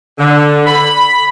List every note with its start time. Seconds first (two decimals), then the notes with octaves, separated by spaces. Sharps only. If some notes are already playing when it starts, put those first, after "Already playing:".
0.18 D3
0.66 B5